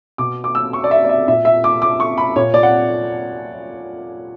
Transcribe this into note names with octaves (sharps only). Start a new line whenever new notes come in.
B2 D6
D6
E6
C#6
D5
E5
D5
E5
A#2 E5
E5
D6
D6
C#6
B5
A#2 C#5
D5
F#5